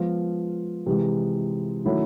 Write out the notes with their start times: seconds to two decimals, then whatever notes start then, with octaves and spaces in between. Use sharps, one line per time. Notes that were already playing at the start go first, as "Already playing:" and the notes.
Already playing: F3 G#3 B3
0.86 C3 E3 G#3
1.85 D#3 F#3 A3 C#4 E4